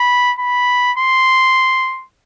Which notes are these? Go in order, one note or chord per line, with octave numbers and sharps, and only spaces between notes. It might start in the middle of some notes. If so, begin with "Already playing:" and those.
Already playing: B5
B5
C6